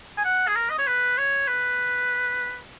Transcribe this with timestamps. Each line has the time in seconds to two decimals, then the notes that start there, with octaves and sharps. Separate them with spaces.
0.18 G#5
0.25 F#5
0.47 G#4
0.55 A#4
0.70 D#5
0.78 C#5
0.87 B4
1.18 C#5
1.48 B4